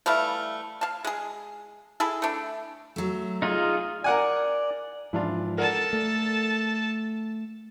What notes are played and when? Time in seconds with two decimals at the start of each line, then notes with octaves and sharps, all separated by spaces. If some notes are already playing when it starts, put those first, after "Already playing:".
0.06 E3 G3 A3 F5
0.81 F5 A5
1.04 G#3 G#4
2.00 E4 G#4 A4
2.22 A3 D4
2.96 F#3 A3
3.42 D#4 F4 G#4
4.04 A#4 D5 F#5 G#5
5.13 G#2 E3 F3 D4 F4
5.58 A4 A#4 D5 F#5 A5
5.93 A3